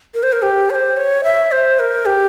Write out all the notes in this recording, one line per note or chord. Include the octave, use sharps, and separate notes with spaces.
A#4
C5
A#4
G4
C#5
C5
C#5
E5
C5
A#4
G4